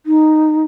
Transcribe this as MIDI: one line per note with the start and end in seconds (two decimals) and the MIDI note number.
0.06 0.65 63